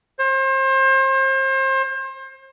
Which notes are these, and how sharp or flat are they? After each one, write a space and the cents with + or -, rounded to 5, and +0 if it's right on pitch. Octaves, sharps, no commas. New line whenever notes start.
C5 +35